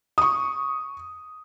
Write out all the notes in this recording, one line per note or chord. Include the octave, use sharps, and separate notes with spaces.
C#6 D#6